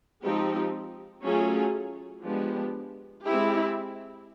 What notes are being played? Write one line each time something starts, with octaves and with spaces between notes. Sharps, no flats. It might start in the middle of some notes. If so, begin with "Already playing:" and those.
F3 G#3 C4 D#4 G4
F#3 A3 C#4 F4 G#4
F3 G#3 B3 D4 G4
G#3 C4 E4 G4